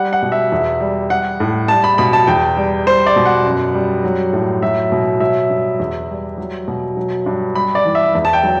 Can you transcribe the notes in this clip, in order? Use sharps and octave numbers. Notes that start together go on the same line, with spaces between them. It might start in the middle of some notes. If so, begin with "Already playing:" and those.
Already playing: G3 F#5
F#5
B2
E5
E2
G3
G3 F#5
A2
G3 A5
B5
B2 B5
A5
E2 G5
G3
G3 C5
D5
B2
F#5
F#2
G3
F#3
A2
F#3 E5
B2
F#3 E5
G2
E2
G3
F#3
B2
F#3
G2
G3 B5
D5
E3
E5
E2
A5
G5
F#3